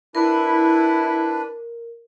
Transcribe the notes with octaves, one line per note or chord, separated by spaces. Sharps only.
D4 E4 A#4 B4